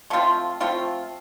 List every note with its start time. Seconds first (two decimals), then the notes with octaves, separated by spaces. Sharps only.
0.10 F3 A3 C4 F4
0.60 F3 A3 C4 F4